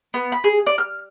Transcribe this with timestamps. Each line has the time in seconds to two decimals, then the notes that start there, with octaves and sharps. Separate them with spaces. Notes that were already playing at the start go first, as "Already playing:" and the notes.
0.14 B3
0.32 B5
0.44 G#4
0.66 D5
0.78 F6